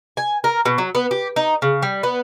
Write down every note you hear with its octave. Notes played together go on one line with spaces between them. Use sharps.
G#5
A#4
B2
F#3
B3
G4
D#4
C#3
G3
B3